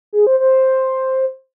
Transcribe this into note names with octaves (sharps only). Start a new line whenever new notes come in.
G#4
C5
C5